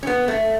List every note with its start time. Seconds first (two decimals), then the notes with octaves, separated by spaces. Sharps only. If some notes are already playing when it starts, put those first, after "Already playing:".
0.03 C#4
0.07 B3
0.28 A3